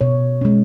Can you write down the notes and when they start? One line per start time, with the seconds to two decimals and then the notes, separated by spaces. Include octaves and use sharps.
0.01 B2 C#5
0.41 G#3 C#4